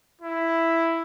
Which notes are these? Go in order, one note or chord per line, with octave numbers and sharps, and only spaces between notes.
E4